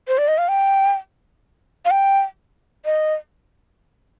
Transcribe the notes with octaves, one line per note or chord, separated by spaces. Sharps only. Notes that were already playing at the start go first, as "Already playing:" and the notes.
C5
D5
D#5
F5
G5
F5
G5
D#5